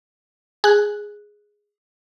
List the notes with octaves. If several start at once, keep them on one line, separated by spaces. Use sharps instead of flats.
G#4 F#6